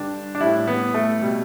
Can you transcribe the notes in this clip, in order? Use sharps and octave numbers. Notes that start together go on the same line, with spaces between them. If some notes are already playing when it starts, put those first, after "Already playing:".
Already playing: G2 D3 G3 D4
D4
A2 G3 E4
B3
A3
B2 G3